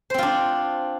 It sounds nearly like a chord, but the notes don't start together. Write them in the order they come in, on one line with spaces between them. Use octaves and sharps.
C5 C4 F4 D4